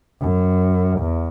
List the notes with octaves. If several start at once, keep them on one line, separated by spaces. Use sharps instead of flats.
F#2
E2